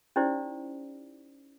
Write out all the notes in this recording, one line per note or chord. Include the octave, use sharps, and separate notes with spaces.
C#4 D#4 E4 G4 C5 D5